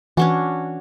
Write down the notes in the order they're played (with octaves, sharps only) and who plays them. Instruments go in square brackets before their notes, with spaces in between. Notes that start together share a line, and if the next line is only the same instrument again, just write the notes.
[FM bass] E3 [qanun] C#4 D4 F#4